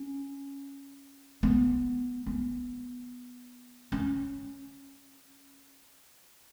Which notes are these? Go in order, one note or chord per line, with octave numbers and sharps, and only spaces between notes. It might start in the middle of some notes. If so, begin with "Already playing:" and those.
Already playing: C#4
B3
B3
C#4